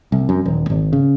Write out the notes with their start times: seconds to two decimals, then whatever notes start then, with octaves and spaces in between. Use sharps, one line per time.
0.12 C2
0.29 F#2
0.45 D#1
0.70 G#1
0.93 C#3